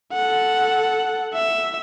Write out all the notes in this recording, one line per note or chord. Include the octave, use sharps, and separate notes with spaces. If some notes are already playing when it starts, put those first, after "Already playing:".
A4 F#5
E5